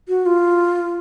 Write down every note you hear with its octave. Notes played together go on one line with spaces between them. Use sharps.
F#4
F4